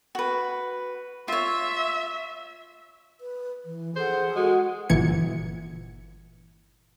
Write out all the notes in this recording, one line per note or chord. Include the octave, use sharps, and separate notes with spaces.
F#4 B4
F4 C#5 E5
B4
E3
G#4 A4 C5 F#5
G#3 F#4
G1 A#2 E3 G#6 C#7